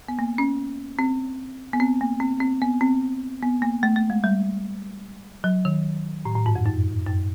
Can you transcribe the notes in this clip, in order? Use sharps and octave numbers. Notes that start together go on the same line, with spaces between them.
B3
A#3
C#4
C4
B3
C4
A#3
C4
C4
B3
C4
B3
A#3
A3
A3
G#3
G3
F#3
D#3
A2
A2
G#2
F2
F#2
F#2